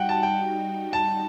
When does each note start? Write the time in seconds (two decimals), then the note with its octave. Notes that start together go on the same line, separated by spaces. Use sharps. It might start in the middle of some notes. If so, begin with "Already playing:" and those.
Already playing: G3 D#4 F#4 F#5 G5
0.09 A5
0.23 G5
0.93 A5